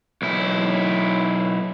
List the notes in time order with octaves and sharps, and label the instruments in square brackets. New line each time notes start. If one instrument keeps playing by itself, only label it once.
[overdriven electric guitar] B1 E4